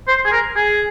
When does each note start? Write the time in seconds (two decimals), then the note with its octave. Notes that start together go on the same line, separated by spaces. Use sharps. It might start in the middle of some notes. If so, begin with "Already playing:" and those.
0.08 C5
0.26 G#4
0.32 A#4
0.56 G#4